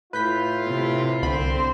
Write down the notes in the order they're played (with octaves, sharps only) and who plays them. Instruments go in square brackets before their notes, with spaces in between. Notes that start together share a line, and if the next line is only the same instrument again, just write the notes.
[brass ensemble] A2 E4 F4 [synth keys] B4 G6 B6
[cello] C3
[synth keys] C2 D3 B5 [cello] C4 C5